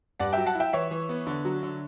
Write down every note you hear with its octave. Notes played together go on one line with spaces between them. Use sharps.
G2 D5 F#5
F#3 E5 G5
F#5 A5
E4
E5 G5
E3 C#5 E5
E3
B3
D3
F#3
D3